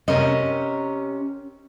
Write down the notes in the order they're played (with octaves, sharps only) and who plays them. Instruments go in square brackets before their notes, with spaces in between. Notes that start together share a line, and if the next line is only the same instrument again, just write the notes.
[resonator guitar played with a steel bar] C3 A#4 [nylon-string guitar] C#4 D#5